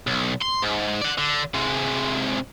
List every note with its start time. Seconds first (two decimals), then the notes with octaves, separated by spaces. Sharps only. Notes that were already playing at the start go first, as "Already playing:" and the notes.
0.07 B1
0.42 C6
0.63 G#2
1.02 D5 F#5
1.18 D3
1.54 C3 G#3